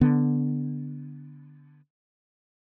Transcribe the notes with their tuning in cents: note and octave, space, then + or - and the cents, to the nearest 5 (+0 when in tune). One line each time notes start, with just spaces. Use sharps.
D3 +0 B3 +0